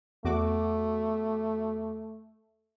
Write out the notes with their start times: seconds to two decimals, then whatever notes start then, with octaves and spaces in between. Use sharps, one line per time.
0.25 E2 A3 F#4 D6